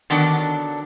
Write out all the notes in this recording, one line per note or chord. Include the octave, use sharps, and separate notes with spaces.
D3 D#3 F#3 B3 D4